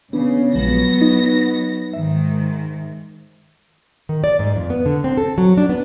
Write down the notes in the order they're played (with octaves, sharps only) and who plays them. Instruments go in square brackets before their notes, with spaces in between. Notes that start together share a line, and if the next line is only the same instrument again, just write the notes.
[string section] C#3 [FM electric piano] B3 D4
[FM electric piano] A#1 F3 G#3 [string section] F#3 B3 A#6
[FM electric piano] D#4
[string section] G#2 D#3 [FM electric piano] E5
[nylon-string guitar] D#3
D5
G#2
F2
B3
D3
C4
A4
F#3
D4
B3